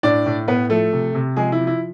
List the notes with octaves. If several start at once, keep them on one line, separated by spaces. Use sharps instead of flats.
A2 D4 D5
A2
A2 B3 B4
F3 A3 A4
C3
C3
F3 G#3 G#4
E4
F3
E4